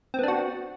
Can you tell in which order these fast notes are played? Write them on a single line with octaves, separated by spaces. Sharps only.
C4 B3 D4 F#4